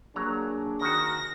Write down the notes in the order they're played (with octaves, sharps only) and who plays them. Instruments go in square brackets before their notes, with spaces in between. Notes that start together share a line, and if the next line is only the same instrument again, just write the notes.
[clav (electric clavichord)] F#3 A#5 [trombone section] A#3 D4 G#4
[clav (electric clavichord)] D#3 F#4 [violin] A#6